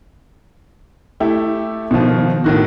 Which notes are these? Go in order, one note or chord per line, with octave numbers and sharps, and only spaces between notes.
A3 E4 G4 A4
B2 D#3 F3
A2 D#3 F#4